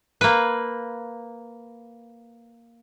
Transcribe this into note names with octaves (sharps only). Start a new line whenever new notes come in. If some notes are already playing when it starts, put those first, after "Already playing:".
A#3 B4